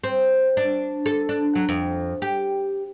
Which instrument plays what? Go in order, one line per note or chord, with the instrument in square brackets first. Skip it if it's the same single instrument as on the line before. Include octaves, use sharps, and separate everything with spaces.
[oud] C4
D4
A4
D4
F#3
F2
G4